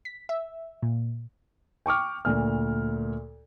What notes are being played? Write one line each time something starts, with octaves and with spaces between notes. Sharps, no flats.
B6
E5
A#2
G5 C#6 D6 F6
D2 A#2 F6